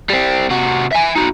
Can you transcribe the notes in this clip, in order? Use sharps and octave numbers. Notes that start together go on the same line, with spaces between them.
G3 C4
C3 F#4
E5 G#5
D#4 F#4